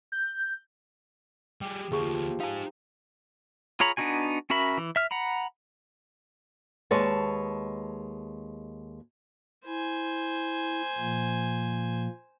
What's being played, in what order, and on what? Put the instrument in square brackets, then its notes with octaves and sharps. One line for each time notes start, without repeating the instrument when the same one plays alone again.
[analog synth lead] G6
[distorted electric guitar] G3 G#4 [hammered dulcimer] G4
[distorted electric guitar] D2 A#3 [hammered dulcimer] F3 [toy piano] G#4 C#6
[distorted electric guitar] D#4 G#5 [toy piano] F5 A5
[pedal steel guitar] F4 G#4 C#5 A#5 B5
B3 D4 D#4 F#4 G#5
C#4 F#4 A#4 E5 B5
E3
E5 F6
F#5 A#5 B5
[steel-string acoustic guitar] D#2 G#3 B4 C#5 A5
[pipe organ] E4 [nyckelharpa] C5 G#5
[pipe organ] A#2 F3 A#3